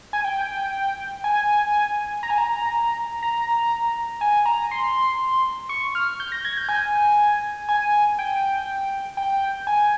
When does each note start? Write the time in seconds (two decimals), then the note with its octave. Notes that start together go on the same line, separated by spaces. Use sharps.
0.13 G#5
0.25 G5
1.24 G#5
2.23 A#5
2.30 G#5
2.38 A#5
3.23 A#5
4.21 G#5
4.46 A#5
4.71 C6
5.69 C#6
5.95 F6
6.20 G6
6.32 A#6
6.45 G#6
6.57 G6
6.69 G#5
7.69 G#5
8.19 G5
9.17 G5
9.67 G#5